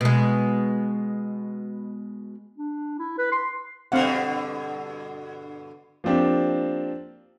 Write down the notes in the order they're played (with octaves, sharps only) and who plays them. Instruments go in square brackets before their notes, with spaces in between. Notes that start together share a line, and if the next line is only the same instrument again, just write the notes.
[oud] B2 G#3
[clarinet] D4
E4
B4
C6
[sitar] G2 B2 D3 [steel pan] C4 F5 F#5
[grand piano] F3 A#3 C4 D4 G4